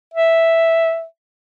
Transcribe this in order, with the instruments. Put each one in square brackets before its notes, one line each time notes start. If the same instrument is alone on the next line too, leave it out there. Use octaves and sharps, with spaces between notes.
[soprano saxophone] E5